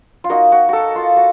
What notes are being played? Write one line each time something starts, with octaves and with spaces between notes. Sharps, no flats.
F4
A#3 D#4 F#4
F#4
F#4 A4
F4
F#4